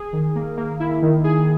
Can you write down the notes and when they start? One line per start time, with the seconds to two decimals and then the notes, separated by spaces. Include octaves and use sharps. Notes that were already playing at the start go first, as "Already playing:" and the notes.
Already playing: G#4
0.13 D#3
0.35 A#3
0.57 A#3
0.80 E4
1.02 D#3
1.24 G#4